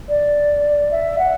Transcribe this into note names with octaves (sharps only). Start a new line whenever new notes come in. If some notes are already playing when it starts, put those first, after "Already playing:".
D5
E5
F#5